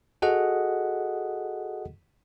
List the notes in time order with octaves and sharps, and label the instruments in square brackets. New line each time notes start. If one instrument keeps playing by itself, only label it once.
[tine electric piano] F#4 G#4 A4 D#5 F#5